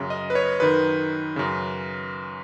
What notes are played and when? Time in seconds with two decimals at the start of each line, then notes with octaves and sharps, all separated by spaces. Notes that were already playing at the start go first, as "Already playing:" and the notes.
Already playing: F#2 C#3
0.10 D#5
0.30 B4
0.35 C#5
0.60 F#2 D#3 B4
1.36 F#2 C#3